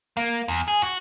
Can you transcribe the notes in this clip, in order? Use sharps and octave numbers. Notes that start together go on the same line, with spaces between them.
A#3
E2
G#4
F#4